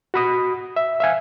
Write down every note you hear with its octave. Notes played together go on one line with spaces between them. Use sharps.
F#4 B5 D#6
E5
E5 F5 G#5